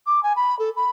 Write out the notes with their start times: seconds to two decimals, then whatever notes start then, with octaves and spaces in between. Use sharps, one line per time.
0.06 D6
0.23 G#5
0.36 B5
0.59 A4
0.76 B5